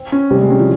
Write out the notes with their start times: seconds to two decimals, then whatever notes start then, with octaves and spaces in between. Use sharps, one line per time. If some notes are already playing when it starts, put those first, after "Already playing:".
Already playing: C4
0.12 C#4
0.31 C3 G3
0.41 G#3
0.50 G3 C#4
0.59 F3